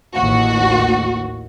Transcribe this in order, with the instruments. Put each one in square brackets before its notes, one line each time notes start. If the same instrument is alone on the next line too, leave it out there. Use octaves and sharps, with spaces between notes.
[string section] A1 D#2 F#4